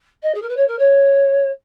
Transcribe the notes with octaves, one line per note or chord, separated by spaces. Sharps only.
D#5
G#4
A#4
B4
C#5
A#4
C#5